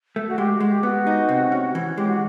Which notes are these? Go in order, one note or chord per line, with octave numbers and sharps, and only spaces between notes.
A3
F#4
G#3 G4
F#4
G#3
G4
B3 F#4
D#4
C3
C#4
E3
G#3 G4
F#4